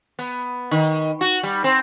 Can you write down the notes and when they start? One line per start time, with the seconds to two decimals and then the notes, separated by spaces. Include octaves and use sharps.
0.19 B3
0.71 D#3
1.21 F#4
1.43 G3
1.64 C4